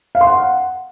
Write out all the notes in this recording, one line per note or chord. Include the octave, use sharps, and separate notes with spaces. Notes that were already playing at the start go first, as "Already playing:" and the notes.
F5
C6
F#5